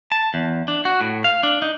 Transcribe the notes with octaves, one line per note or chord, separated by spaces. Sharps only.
A5
E2
D4
F#4
A2
F5
D4
D#4